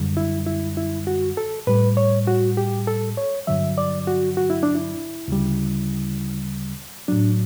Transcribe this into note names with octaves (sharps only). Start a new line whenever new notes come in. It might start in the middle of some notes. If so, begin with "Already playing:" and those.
Already playing: F#2 D3 G3
E4
E4
E4
F#4
A4
A2 G3 B4
C#5
F#4
G4
A4
C#5
G2 D3 F#3 E5
D5
F#4
F#4
E4
D4
E4
D2 C#3 G3
A2 F#3 D4